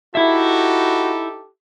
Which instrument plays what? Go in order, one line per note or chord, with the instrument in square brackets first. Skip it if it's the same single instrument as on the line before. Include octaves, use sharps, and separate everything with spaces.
[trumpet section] D#4 G4 A4 [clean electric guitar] E4 E5 [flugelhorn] F#4